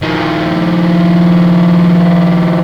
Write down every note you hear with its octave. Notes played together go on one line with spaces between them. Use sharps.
D#3 F3